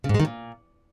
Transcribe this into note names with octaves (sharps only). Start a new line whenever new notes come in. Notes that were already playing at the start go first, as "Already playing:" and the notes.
C#3
G#2
G#3
D#3
A#2